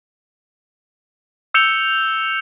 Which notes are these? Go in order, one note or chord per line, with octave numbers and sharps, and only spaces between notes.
E6 G6 C#7 E7 F7 G7